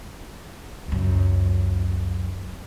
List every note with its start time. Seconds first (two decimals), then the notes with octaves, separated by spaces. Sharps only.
0.88 C#2 F#2